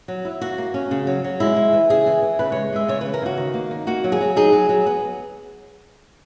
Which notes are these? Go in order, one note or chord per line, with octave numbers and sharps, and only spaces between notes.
F#3
E4
A#3 F#4
A#3
C#4
C#3
F#3
F#3
G#3 E4
G#3
E3
C#3 G#4
E3
E3
C#3 B4
G#3 C#5
G#3 E5
C#3 C#5
B4
E3
A#4
C#3 F#4
D#3
A#3
D#4
A#3 F#4
F#3
G#4
F#3
D#4 G#4
F#3
F#3
B3